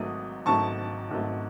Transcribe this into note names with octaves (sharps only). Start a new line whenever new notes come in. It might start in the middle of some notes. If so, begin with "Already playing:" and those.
Already playing: G#1 G#2 F#3 A3 D#6
G#1 G#2 F#3 A3 A5 C#6
G#1 G#2 F#3 A3